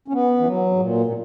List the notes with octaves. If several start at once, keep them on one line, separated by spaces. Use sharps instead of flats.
C#4
B3
E3
F#3
G#2
A#2
A#2